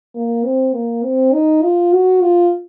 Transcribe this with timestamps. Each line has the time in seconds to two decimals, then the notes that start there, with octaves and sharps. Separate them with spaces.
0.15 A#3
0.45 C4
0.74 A#3
1.03 C4
1.33 D#4
1.63 F4
1.93 F#4
2.22 F4